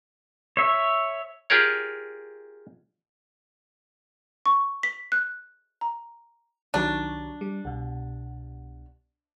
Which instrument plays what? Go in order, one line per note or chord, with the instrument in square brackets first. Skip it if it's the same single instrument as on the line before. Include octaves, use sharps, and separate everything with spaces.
[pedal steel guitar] C#5 E5
[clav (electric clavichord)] F4 G4 G#4 A#4 C#5
[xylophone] C#6
B6
F#6
A#5
[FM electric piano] C2 D#3 F#3 [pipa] D4
[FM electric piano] G3
C2 B2